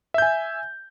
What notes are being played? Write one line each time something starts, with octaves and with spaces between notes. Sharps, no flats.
E5 G#5 G6